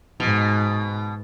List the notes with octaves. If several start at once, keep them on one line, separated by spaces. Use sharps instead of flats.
G#2 B2